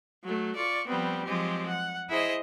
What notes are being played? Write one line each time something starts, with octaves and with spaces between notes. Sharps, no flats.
F#3 A3
F4 D5 C#6
F3 G3 B3 C4
F3 F#3 G#3 C4 G4
F#5
E4 G#4 C5 D#5